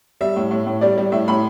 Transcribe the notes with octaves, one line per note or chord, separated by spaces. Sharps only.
G3 E5
A2
A2
A2
G3 D5
G3
A2 E5
A2 B5